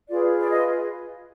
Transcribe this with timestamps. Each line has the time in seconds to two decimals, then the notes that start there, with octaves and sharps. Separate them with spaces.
0.09 F4 G#4 B4 D5
0.40 D5
0.50 D#5